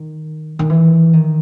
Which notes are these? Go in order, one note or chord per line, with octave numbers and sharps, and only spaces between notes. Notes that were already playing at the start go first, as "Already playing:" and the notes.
Already playing: D#3
D#3
E3
D#3